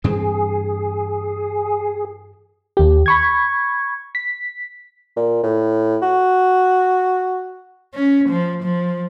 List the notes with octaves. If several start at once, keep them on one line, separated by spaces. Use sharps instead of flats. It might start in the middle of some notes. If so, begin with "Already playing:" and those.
G2 E3 C4 G#4
D#2 G4
B5 C#6 G#6
B6
A#2
A2
F#4
C#4
F3
F3